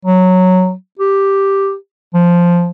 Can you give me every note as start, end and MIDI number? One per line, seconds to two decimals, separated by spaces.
0.05 0.72 54
0.99 1.74 67
2.14 2.71 53